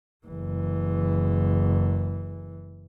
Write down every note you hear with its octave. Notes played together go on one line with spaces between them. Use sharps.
F#1 E3